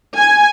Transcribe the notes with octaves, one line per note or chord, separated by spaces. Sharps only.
G#5